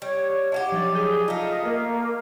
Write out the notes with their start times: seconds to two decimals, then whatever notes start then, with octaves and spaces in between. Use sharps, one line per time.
0.02 G3 C#5
0.52 D4 F4 G4 D#5 F5 F#5
0.72 F3 F#3 A6
0.95 G#4 G6 D#7 G7
1.28 A3 D#4 F4 D#5 F5
1.65 A#3 A#4